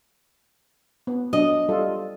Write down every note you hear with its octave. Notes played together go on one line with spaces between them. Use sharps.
B3
F#3 D4 D#5
G3 F4 A4